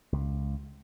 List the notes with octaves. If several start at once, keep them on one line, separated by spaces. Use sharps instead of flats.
C#2